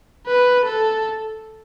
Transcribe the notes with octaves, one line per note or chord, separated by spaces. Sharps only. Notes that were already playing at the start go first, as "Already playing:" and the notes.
B4
A4